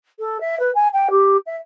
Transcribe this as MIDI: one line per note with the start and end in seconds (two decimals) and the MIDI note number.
0.19 0.38 69
0.40 0.58 76
0.59 0.71 71
0.75 0.88 80
0.93 1.08 79
1.10 1.37 67
1.46 1.57 76